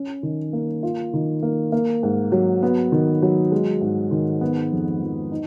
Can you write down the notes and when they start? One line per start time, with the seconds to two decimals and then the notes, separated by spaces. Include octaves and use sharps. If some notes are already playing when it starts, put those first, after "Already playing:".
Already playing: C#4
0.23 D#3
0.53 A#3
0.83 F4
1.13 D#3
1.43 A#3
1.72 A#3
2.03 G#2
2.32 F#3
2.63 B3
2.92 D#3
3.22 F#3
3.52 G#3
3.81 G#2
4.11 D#3
4.41 B3
4.72 F2
5.01 F3
5.31 D#4